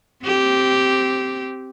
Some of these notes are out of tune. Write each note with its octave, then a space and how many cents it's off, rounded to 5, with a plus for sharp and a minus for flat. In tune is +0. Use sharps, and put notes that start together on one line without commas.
C4 +0 G4 -10